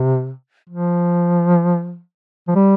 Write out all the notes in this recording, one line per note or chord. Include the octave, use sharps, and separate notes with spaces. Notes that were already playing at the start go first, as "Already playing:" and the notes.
Already playing: C3
F3
F3
G3